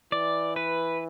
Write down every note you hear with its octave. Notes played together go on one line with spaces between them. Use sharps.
E3 D5
B4